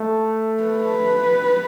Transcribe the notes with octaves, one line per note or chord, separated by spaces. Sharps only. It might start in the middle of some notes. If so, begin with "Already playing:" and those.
Already playing: A3
B4